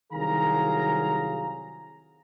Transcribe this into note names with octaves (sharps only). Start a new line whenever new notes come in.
C2 D#3 F#3 G#4 F5 A#5